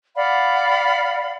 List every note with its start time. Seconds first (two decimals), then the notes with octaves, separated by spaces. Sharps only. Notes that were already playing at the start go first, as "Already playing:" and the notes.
0.16 D5 F5 F#5 B5